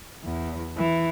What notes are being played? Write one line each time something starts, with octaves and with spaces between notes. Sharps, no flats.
E2
E3